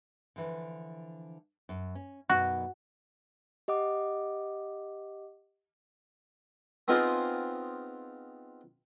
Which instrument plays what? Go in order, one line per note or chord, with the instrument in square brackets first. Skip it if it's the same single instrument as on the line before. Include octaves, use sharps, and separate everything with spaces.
[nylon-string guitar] D3 E3 F3
F#2
C#4
[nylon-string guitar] F#2 B2 D#4 [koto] F#4
[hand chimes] G4 D#5 F#5 D6
[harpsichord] B3 C4 D#4 F4 G#4 C5